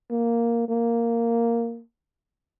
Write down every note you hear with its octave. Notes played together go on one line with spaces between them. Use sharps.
A#3
A#3